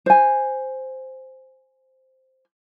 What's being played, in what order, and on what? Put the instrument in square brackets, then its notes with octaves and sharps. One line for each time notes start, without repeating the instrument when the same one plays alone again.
[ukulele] C5 G#5